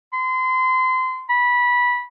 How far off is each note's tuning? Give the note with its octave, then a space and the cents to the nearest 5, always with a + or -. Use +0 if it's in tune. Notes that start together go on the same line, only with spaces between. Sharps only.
C6 -30
B5 -15